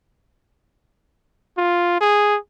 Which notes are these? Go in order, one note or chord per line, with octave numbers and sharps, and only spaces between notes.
F4
G#4